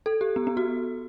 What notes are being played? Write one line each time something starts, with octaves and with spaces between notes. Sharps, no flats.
A4
G4
B3
B3
F#4